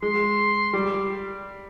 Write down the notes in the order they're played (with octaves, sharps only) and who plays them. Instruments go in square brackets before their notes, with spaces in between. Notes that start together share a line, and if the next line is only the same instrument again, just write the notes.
[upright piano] G#3 [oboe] C6
[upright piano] G3 [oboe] D6